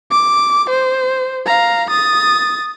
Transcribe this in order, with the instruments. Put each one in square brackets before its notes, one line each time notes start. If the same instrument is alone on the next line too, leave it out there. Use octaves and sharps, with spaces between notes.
[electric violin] D6
C5
F5 A#5
D#6 A6